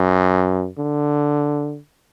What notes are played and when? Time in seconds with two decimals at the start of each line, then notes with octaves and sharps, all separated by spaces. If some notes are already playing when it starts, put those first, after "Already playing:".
Already playing: F#2
0.78 D3